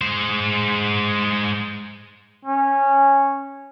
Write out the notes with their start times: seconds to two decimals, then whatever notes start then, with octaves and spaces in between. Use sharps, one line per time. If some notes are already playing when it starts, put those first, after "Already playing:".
0.01 G#3 C5
2.45 C#4